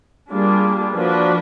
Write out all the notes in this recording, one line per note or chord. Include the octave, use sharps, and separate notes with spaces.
G3 A#3 D4 F4 G#4
F3 A#3 D4 F#4 B4